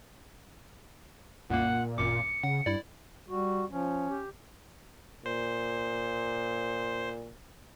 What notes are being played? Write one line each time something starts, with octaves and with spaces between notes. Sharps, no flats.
C2 F#2 A#2 A#3 F#5
G#1 F#2 D6 C#7
C#3 F#5
G2 E4 D5
G3 F#4
F3 C#4
G4
A#2 C5